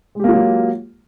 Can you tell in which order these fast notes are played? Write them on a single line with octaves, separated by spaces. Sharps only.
G#3 G4 A#3 F4 F#3